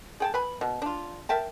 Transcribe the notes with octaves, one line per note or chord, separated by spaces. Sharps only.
G#4 G5 A5
B4 G#5 B5
B2
D4 F4
A#4 E5 G5 A5